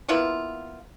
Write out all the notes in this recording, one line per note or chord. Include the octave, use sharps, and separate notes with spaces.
A#3 B3 E4 F4